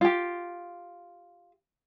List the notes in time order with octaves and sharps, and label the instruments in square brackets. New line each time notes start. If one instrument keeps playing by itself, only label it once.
[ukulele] F4 G4